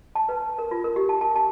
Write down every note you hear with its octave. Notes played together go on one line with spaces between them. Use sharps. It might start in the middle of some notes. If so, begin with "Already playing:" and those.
A5
B4
A#4
F4
A#4
G4
A5
A5
A5